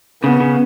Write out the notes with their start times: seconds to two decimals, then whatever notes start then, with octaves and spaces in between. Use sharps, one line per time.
0.23 C#3 B3
0.40 C#3